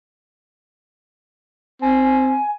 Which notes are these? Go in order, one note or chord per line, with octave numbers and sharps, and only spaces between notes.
C4 G#5